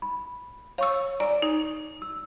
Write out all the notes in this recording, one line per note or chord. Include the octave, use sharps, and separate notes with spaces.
B5
C#5 F5 C#6 E6
D5 G#5 A#5 D6
D#4
E6